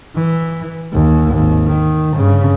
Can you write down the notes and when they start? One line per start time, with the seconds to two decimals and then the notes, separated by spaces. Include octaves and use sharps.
0.16 E3
0.93 D#2
1.33 G#1 D#2
1.67 D#3
2.17 G2 C#3